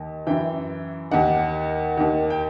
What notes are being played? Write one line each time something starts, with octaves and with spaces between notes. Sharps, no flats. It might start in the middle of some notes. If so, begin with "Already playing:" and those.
Already playing: D#2 D#3
F#2 E3 G5
D#2 D#3 F#5
D#2 D#3
G5